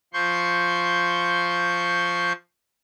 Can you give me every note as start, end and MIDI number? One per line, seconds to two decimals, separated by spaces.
0.13 2.33 53
0.13 2.33 84
0.13 2.33 85
0.13 2.33 91